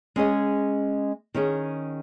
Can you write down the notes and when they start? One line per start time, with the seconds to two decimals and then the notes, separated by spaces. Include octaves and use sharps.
0.16 G#3 C#4 G#4 D#5
1.34 D#3 C#4 G#4